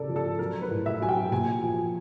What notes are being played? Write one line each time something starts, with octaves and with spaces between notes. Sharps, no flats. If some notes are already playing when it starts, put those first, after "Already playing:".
Already playing: C#3 A4 A#4 D5
F3
A4
F#3 A#4
B4
A2
E5
F#3 G#5
G5
A#2 G#5
F3